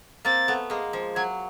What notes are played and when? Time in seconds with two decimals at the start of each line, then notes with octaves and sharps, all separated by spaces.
0.25 A#3 C4 A6
0.48 A3 B3
0.70 G#3 A#3
0.93 F3
1.15 F#3 G#6